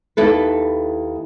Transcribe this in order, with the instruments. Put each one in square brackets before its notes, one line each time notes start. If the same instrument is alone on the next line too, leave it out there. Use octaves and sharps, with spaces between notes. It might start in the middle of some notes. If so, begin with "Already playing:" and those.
[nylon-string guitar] D#2 E4 A4 B4